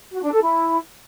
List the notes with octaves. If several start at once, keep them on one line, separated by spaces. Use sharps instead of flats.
F#4
D4
A4
E4